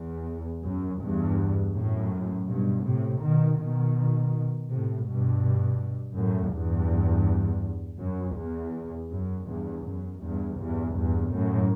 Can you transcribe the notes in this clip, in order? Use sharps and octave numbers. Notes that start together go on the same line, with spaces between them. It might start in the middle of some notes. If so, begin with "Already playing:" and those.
Already playing: E2
F#2
E2 G2
F#2 A2
G2 B2
A2 C3
B2 D#3
B2 D#3
A2 C3
G2 B2
F#2 A2
E2 G2
F#2
E2
F#2
E2 G2
F#2
E2 G2
E2 G2
E2 G2
F#2 A2